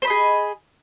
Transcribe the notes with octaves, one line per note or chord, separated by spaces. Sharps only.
G#4 C5 D#5 B5